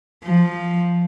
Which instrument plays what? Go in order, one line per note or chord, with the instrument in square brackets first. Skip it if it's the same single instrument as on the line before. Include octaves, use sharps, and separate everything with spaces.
[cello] F3